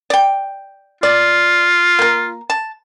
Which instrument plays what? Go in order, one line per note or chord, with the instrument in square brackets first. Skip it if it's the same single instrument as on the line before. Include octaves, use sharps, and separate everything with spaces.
[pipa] D5 G5
[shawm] F4 [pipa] D5
[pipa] A#3 A#4
A5